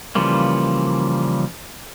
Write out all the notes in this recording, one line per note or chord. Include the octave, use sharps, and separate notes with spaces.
C#3 E3 F3 G3 A#3